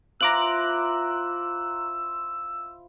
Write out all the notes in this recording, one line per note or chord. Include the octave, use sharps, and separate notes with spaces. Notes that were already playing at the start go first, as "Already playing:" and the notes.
E4 F4 C5 A#5 D6 E6 F#6